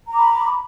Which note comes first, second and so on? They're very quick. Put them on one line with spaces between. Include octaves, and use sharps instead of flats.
A#5 D6 B5